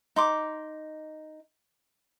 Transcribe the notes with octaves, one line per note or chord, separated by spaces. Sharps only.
D#4 C6 D6